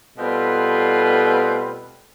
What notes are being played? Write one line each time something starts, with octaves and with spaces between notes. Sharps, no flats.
B2 G3 A3 C4 F4 B4